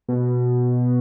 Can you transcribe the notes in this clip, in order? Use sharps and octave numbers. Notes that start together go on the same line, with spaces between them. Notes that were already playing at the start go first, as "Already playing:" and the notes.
B2